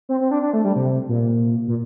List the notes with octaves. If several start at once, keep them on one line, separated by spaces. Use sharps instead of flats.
C4
C4
D4
D4
A3
G3
C3
A#2
A#2